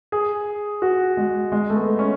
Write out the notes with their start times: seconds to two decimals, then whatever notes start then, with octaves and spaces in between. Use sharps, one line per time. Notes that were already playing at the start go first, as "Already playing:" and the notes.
0.12 G#4
0.82 F#4
1.17 G#3
1.52 G#3
1.70 A3
1.76 B3
1.99 C#4